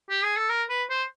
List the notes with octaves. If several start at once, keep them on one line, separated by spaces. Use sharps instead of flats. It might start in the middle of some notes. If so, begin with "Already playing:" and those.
G4
G#4
A4
A#4
B4
C5